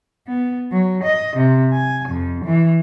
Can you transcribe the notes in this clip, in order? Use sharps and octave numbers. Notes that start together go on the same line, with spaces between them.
B3
F#3
D#5
C3
G#5
F2
E3